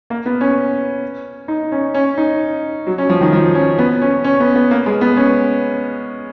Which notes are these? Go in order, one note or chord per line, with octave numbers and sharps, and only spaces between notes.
A#3
B3
C#4
D#4
C#4
C#4
D#4
F#3
C#4
F3
D#3
F3
C#4
B3
C#4
C#4
B3
B3
A#3
G#3
B3
C#4